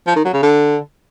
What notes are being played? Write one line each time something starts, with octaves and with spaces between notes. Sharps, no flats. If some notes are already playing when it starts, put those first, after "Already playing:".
F3
D#3
F#3
C#3
D3